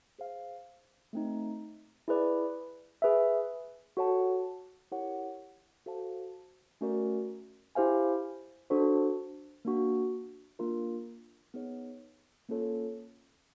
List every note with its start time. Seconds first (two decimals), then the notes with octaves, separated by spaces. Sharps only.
0.19 G#4 C5 F5
1.13 A3 C4 D#4
2.08 E4 G#4 B4 D5
3.02 G#4 B4 E5
3.97 F#4 A4 C#5 F#5 A5
4.91 E4 G4 A#4 C#5 F#5
5.86 F#4 A4 C5 F5 A5
6.81 A3 C#4 F#4 A#4 D5
7.75 E4 G4 C5 F5 G#5
8.70 D4 F#4 A4 C5
9.65 A#3 D4 F#4
10.59 A#3 D4 F4 A#4
11.54 B3 D#4 G#4 C#5
12.49 A#3 C#4 F4 A4 C#5